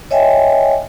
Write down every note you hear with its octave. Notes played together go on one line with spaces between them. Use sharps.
C#5 D#5 E5 G5 G#5